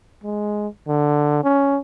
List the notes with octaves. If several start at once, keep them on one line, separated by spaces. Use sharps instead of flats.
G#3
D3
C#4